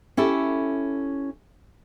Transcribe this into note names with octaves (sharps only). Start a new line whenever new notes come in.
C#4 E4 G4 A4